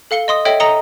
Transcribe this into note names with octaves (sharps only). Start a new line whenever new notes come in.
A4 F5 C#7 G7
D#5 C6 D#6
A4 C#5 D#5 E5 G5
A4 D#5 A#5 D#6 C#7 G7